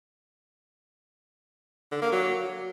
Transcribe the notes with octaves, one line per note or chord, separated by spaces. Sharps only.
D3
A#3
F#3